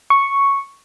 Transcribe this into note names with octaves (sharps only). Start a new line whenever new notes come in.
C#6